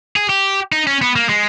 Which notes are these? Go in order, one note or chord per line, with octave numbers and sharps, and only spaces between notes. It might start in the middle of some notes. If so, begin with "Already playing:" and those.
G#4
G4
D#4
C#4
B3
A#3
G#3